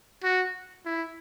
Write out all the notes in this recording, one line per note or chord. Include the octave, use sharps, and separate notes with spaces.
F#4
E4